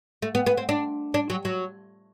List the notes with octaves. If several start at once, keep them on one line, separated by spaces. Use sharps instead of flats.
A3
B3
B3
C4
D4
D4
F#3
F#3